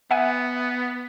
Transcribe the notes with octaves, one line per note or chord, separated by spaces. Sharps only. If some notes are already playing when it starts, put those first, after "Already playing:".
B3 E5 F#5 G#5